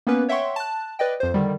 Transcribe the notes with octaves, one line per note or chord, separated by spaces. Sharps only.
A#3 B3 C#4 B4
C#5 E5 F#5 G5 C6 C#6
A5 F#6
B4 D5 D#5 G5
F2 C5
D3 D#3 G3